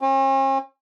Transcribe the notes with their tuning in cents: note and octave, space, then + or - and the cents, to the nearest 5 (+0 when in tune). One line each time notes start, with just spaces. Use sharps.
C#4 -45